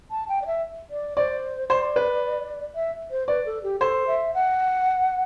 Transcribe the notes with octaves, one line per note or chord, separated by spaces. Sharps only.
A5
G5
D5
E5
D5
C5 D5
C5 D5
B4
E5
C5
B4 D5
A4
G4
A4 C5
E5
F#5